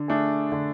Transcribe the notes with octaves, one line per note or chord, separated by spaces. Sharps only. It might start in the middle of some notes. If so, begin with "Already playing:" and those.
Already playing: D3
A3 D4 G#4
D3